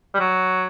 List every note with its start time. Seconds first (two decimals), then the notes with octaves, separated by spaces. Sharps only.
0.14 G3
0.20 F#3